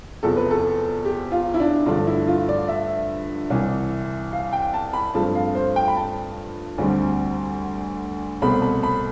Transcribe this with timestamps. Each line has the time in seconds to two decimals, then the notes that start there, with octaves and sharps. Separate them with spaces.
0.23 E2 C3 F3 A4
0.36 B4
0.51 A4
1.05 G4
1.32 F4
1.54 E4
1.60 D4
1.86 G2 D3 F3 A3 D4
2.07 E4
2.27 F4
2.49 D5
2.68 E5
3.50 C2 C3 E3
4.33 F5
4.53 G5
4.74 A5
4.93 B5
5.14 G2 F3 A3 C4 A5
5.35 F5
5.55 C5
5.76 G5
5.88 B5
5.97 A5
6.78 D2 D3 G3 C4
8.42 C2 B2 A3 C4 B5
8.62 B5
8.83 B5